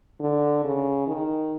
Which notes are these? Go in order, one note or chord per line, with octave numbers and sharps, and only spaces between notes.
D3
C#3
D#3